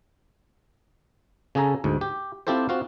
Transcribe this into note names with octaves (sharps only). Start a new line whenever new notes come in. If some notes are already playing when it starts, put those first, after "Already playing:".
C#3 C#4 G#4 A4 A#5
D2 G#2
G4
C4 E4 F4 G4 A4 C5
C4 F4 F#4 F5